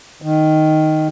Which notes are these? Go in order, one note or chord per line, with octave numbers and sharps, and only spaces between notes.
D#3